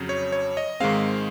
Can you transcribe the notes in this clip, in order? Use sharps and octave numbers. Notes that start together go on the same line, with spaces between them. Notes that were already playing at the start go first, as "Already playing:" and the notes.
Already playing: F2 C#3 F#3
C#5
C#5
D#5
G#2 D#3 G#3 C4 F5